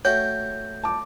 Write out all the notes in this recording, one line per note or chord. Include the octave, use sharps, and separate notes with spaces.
A3 F#4 C#5 G5 G6
A5 D6